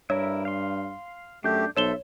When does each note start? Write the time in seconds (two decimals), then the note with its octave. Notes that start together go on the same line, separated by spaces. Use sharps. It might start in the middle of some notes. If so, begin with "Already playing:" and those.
0.10 G2 E4 A#4 C#5 E5
0.45 F5 C6
1.44 F#2 A3 D4 G4 G6
1.77 B1 A4 C5 C#5 E5 E7 G7